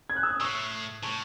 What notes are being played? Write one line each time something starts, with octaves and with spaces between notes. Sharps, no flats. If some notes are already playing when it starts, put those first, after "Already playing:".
G#6
F#6
E6
D#6 F#6
A2 C#6 E6
A2 A5 C#6